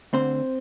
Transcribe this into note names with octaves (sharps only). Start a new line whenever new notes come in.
D2 D3 C4 C5